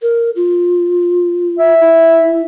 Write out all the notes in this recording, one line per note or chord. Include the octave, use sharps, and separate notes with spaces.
A#4
F4
E5
E4